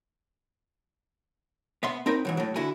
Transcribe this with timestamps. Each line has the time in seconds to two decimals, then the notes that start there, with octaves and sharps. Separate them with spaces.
1.83 B3 E5 C6
2.06 C4 D#4 A#4 B4
2.25 G#2 E3 F#3
2.37 A2 F#3
2.56 D3 E4 F#4 G#5